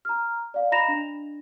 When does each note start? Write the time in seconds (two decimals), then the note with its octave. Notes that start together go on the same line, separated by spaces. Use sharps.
0.05 A#5 F6
0.54 D5 F5
0.71 D#5 A#5 B5 A#6 E7 F7
0.88 D4